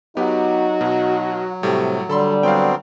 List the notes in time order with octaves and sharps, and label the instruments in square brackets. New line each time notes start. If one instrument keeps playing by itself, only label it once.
[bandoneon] F#3 [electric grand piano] B3 G4 [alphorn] D#4 [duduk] F#4
[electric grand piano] B2
[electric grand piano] A2 G3 A3 [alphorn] C3
[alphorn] D3 [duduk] G3 [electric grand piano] A4 B5 C6
[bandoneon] F#3 B3 C4 [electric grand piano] F5 G5